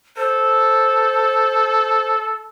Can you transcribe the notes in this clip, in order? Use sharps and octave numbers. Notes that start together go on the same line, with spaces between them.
A4 C5